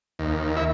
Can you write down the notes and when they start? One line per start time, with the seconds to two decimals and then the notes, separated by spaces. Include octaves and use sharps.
0.19 D#2
0.56 E4